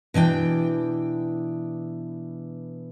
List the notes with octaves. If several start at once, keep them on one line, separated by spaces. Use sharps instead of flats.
B2 E3 D4 G5